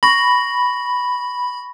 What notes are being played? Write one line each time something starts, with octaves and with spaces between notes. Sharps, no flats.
B5 C#6 A#6